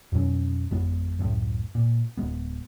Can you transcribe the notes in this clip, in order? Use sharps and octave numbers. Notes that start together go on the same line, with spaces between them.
F2 B2 F#3 C#4
G#1 F2 G#3 B3
C#2 F#2 A2
A#2
D1 G#3 B3